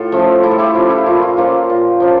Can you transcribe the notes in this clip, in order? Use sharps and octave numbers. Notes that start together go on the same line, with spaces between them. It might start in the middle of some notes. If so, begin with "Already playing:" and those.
Already playing: A2 F4 A4
F3 A3 C#4
A2 E4 G4
A4
E4 G4
F3 A3 C#4 F4
E4
A#2 F4
F4
F3 A#3 C#4 F4 A4
A#2
F3 A#3 C#4